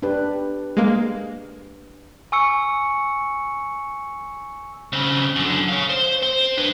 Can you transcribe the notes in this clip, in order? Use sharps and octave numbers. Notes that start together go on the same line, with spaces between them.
D4 G4 B4
G#3 A#3
G#5 C#6 E6 C#7
C#3 C4
F#2 D3
C#5 F5
C5
C4 C5
D4 B4